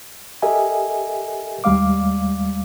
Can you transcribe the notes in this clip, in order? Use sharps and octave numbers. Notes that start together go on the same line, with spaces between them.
G4 A4 A#4 D#5 E5 G#5
D#2 G3 G#3 F5 D6